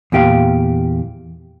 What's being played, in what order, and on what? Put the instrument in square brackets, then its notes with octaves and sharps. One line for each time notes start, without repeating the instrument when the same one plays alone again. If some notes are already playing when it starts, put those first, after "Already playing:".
[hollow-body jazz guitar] E2 A#2 G4 F5